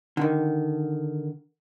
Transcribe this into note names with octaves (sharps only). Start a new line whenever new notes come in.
D3 D#3